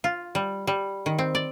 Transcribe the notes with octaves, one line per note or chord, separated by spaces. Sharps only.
F4
G3
G3
D#3
C4
D5